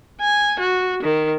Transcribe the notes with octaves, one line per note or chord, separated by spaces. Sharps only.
G#5
F#4
D#3